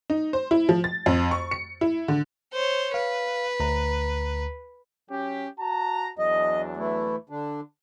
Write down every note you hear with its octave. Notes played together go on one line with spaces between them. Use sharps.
D#4
C5
E4
F3
A6
F2
C#6
C#7
E4
D3
C5 C#5
B4 F5
D2 A#5
F#3 C#4 G4
F#4 A5 A#5
E2 F#3 D4 D#5
E3 A3 E4
D3 D4